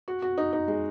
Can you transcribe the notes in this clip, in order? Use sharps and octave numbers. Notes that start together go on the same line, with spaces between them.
F#4
F#4
D#4
D#4
G#3